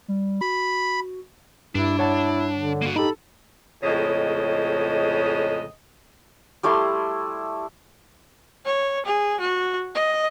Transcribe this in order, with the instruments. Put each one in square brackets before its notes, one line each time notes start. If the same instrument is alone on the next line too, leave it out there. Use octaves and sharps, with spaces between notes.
[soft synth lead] G3
[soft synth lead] F#4 [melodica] B5
[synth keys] G2 [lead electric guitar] D4 [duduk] E4
[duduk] E4 [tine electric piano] C#5 F#5 A5
[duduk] D3
[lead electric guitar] A#3 F#4
[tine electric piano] D#4 G4 [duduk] A4 [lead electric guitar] B5
[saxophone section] F2 A2 C#3 G#3 D#5
[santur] G3 A3 E4 C6
[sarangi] C#5
G#4
F#4
D#5